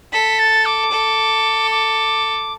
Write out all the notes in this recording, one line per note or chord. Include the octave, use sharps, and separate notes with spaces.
A4 B6
A6
D6
A4
D6